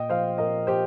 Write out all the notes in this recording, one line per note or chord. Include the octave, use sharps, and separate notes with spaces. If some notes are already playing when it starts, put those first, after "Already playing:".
Already playing: A#2 D#5 G5
F3 C5 F5
A#2 A#4 D#5
F3 G4 C5